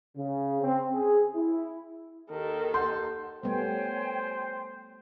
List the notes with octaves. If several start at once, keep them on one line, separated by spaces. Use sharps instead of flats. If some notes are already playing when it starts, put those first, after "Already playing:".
C#3
C4
G#4
E4
D#2 D#3 A4
F#5 C6 G6
G3 A3 B3 C5 C#5 G5 G#5